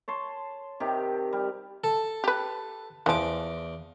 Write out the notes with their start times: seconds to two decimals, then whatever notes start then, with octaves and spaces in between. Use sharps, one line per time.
0.08 C#5 A5 C6
0.80 C3 D#3 G4
1.33 G3
1.84 A4
2.24 G4 B4
3.06 E2 E3 F3 D6